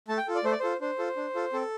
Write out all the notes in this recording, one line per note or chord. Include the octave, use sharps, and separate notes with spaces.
A3 A5
G5
F4 A4
D5
A3 C5
D5
F4 A4 C5
D4 C5
F4 A4
D4
F4 A4
C4 A4